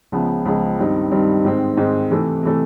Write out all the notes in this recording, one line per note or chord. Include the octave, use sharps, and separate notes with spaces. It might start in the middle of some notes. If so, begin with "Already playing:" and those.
C#2 C#3 F3 G#3 B3
C#2 C#3 F3 G#3 B3
G2 D#3 G3 C4 D#4
G2 D#3 G3 C4 D#4
G#2 D#3 G#3 C4
G#2 D#3 G#3 C4
C3 E3 A3
C3 E3 A3